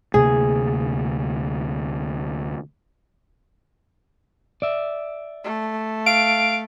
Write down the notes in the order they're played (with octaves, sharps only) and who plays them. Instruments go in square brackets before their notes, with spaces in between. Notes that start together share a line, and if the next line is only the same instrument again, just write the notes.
[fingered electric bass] D2 C3 A#3 [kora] G#4
[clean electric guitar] D5 E5
[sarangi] A3
[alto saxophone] F5 [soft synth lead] D7